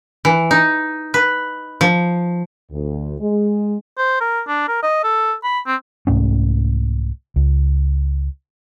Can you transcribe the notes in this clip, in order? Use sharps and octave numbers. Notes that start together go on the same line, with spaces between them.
E3
D#4
B4
F3
D2
G#3
C5
A#4
D4
A#4
D#5
A4
B5
C4
C2 G#2 A3 C#4
C#2